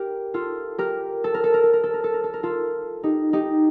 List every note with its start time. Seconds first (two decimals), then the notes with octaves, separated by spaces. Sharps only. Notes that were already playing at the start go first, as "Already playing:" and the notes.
Already playing: G4 A#4
0.34 F4 A4
0.78 G4 A#4
1.24 A4
1.34 A#4
1.44 A4
1.54 A#4
1.63 A4
1.73 A#4
1.83 A4
1.94 A#4
2.04 A4
2.14 A#4
2.24 A4
2.34 A#4
2.43 F4 A4
3.03 D#4 G4
3.33 D#4 G4